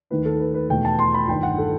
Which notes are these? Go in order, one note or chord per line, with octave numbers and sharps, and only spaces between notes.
D#2 D#3 A3 E4 B4
A4
B4
B4
E2 B2 A3 D#4 G5
A5
C6
B5
G1 G2 D#3 G5
F#5
A4